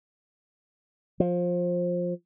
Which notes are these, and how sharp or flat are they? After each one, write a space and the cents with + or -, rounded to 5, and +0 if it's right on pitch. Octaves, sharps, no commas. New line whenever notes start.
F3 +20